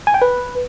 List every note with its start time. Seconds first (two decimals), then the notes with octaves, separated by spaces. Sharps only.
0.07 G#5
0.14 G5
0.22 B4